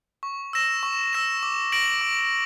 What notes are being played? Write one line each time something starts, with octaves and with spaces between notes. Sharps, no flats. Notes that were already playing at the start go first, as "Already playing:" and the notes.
C#6
E6 A#6 E7
C#6
E6 A#6 E7
D6
A#6 D7 F#7
D6